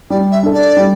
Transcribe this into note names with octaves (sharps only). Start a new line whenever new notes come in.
G3 D5
E5
D4 A4
D5
G3